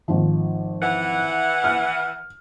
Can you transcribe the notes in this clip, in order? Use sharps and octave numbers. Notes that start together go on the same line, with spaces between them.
G#1 F3
E3 F#5
F6